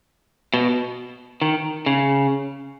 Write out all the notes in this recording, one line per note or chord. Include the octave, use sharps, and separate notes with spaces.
B2
D#3
C#3